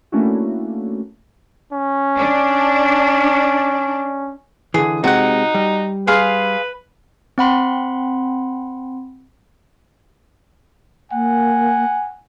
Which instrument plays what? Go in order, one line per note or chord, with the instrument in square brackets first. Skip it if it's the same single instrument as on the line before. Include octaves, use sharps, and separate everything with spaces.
[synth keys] A3 A#3 C#4 D4 E4 F#4
[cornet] C#4
[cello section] D4
[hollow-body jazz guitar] D3 E3 [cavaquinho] G#4
[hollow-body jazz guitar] C3 G#3 C4 [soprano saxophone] D#4 [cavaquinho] F#4 F#5
[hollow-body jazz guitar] G3
[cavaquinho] G#4 F5 C6 [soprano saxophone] B4
[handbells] C4 F#5 B5 C6
[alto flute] A#3 [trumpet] F#5 [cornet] G#5